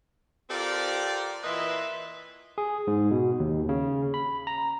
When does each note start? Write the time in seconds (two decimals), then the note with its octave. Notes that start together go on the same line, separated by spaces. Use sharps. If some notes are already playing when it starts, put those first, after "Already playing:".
0.50 C4 F4 G4 A4 A#4 D5
1.43 A#2 E3 B4 D#5 E5 C6
2.58 G#4
2.87 G#2
3.11 B2
3.40 D#2
3.69 C#3
4.14 B5
4.47 A#5